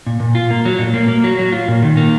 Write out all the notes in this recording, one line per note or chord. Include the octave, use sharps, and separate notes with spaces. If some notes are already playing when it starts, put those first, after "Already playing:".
A#2
A#2
F4
A#3
F#3
A#2
A#3
A#3
F#3
F#3
F4
A#2
D#3
A#3